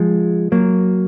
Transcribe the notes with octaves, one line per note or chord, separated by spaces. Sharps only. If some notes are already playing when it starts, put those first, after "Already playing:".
Already playing: F3 G#3
F#3 A#3